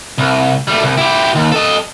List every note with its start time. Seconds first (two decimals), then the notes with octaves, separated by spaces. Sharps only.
0.18 C2
0.68 G3 A3
0.83 C2
0.97 E4 G4
1.35 D#2
1.52 A4 D#5